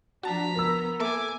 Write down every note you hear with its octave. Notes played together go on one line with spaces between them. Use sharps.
F3 D4 F#4 A5 A#5 B6
B3 A#4 E6
A#3 A4 E5 G#5 D6